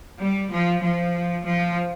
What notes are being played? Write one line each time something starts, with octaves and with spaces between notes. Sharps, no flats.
G3
F3
F3
F3